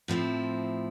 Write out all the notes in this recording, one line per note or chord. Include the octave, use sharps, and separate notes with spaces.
A2 F3 C4 E4